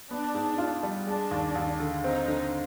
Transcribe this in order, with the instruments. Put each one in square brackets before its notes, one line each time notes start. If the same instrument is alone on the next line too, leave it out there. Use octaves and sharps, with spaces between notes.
[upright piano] B3 [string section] D4
[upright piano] G#2
F4
G3
[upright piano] G#3 [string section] D4
[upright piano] D#2
D#2
D3
[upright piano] C4 [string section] D#4
[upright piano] D3